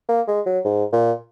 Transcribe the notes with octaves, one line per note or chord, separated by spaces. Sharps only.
A#3
G#3
F#3
G#2
A#2